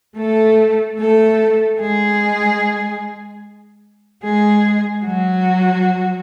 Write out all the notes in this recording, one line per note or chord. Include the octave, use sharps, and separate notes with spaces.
A3 A4
A3 A4
G#3 G#4
G#3 G#4
F#3 F#4